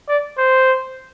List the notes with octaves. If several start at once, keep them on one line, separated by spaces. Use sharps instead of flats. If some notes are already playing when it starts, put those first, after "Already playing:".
D5
C5